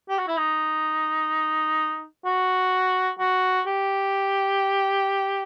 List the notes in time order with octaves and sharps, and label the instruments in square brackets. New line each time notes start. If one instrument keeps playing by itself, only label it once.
[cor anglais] G4
F#4
E4
D#4
F#4
F#4
G4